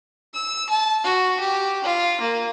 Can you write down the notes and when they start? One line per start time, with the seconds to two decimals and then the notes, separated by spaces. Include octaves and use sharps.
0.34 E6
0.69 A5
1.04 F#4
1.40 G4
1.84 F4
2.20 A#3